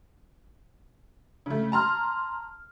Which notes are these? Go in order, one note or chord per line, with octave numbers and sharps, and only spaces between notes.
C#3 A3
A5 A#5 C6 F6